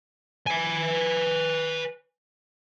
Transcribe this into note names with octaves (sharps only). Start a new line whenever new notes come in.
B4 G#5